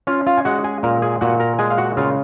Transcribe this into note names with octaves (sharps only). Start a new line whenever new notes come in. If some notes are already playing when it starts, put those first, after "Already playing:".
C#4 F4 F5
F4 F5
G#5
G#3 F#4 F#5
G#4 G#5
A#2 A#4 A#5
G#4 G#5
A#2 F#4 F#5
A#4 A#5
G#3 G#4 G#5
F5
F#4 F#5
C#3 F4 F5